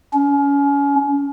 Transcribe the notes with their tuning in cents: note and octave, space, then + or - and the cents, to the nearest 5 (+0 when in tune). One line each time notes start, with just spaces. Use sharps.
C#4 +30